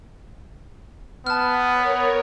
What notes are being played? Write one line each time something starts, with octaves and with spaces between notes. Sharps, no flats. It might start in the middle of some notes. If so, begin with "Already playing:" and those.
B3 A5 F6
A#4 C#5